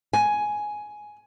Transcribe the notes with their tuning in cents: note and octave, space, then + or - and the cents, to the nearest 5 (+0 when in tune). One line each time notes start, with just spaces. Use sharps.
G#5 +10